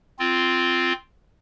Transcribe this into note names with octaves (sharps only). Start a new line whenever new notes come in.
C4 F4